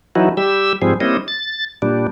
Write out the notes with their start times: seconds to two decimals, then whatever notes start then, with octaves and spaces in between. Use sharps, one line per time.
0.15 E3 F#3 D#4 E4 F#4
0.37 G3 G4 E6
0.82 G#2 F3 G3 C4 G#4
1.01 G3 A#3 C4 C#4 E4 D#5
1.28 A6
1.82 A#2 G3 D4